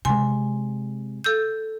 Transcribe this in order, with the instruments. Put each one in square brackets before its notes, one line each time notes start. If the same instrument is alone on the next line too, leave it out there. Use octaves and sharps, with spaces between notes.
[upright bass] C3 G#3 [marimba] G#5 C6
[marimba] A4 E6 G6